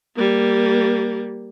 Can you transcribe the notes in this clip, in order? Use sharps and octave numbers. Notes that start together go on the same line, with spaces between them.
G3 A#3